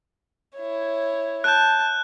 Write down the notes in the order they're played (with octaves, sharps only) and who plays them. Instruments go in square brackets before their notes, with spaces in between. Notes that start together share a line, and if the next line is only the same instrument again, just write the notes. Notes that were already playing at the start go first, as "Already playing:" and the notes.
[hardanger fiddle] E4 C#5
[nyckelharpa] A5 [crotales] F#6 G6